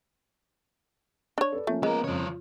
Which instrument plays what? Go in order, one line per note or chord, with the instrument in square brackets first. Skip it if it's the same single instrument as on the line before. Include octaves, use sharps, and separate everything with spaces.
[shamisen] D4 C#5
[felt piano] A4 B4 D5
[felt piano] F3 A#3 C#4 [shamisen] A3
[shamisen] G#3 [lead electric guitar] B3 A#4
[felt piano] F2 C#3 [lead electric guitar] F3 C#5
[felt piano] F4